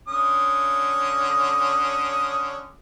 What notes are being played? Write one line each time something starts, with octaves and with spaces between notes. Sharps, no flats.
D3 C#4 D#6